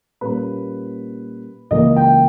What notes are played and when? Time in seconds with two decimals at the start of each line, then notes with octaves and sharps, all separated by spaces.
0.21 A#2 G3 A#3 C#4 B4
1.71 C#2 C#3 E3 A#3 D#5
1.96 G5